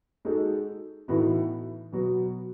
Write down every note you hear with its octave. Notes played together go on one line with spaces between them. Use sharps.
G#3 D#4 F#4 A4
A2 E3 B3 D#4 F#4
B2 F#3 B3 F#4